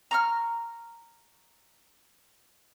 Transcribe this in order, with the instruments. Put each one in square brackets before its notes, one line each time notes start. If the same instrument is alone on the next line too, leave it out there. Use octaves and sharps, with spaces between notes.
[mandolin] A#5 C#6 F6